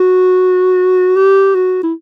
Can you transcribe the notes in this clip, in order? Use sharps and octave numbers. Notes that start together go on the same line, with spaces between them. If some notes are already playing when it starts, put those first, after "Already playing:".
Already playing: F#4
G4
F#4
E4